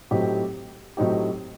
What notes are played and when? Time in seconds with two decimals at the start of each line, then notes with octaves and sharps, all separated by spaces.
0.11 A2 F#3 C4 D#4 G4
0.97 A2 F#3 C4 D#4 G4